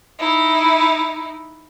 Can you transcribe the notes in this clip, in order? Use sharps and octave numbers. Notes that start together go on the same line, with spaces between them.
D#4 E4